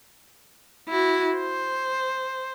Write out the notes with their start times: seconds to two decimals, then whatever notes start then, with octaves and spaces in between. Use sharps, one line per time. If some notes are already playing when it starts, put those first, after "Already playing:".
0.89 E4 F#4
1.37 C5